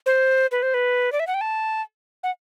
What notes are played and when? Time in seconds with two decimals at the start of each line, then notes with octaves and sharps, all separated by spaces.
0.06 C5
0.52 B4
0.63 C5
0.74 B4
1.12 D5
1.20 E5
1.27 F#5
1.34 G5
1.41 A5
2.23 F#5